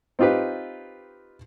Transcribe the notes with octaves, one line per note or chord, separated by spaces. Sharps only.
C4 D#4 F4 G4 B4